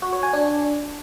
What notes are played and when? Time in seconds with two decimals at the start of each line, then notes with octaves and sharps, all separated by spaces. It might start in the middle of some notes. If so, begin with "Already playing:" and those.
0.02 F#4
0.13 C#5
0.23 G#5
0.33 D4